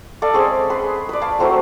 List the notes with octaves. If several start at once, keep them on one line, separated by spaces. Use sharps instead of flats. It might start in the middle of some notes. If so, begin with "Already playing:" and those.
A4 D5 F5
G#3 C4 C#4 G#4
G#4 B4 C6
B4 D5
C#5 F5 A5
F#3 A3 C4 F5